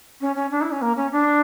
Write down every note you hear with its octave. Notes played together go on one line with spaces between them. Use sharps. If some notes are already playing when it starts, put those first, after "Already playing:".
C#4
C#4
D4
E4
C#4
A#3
C#4
D4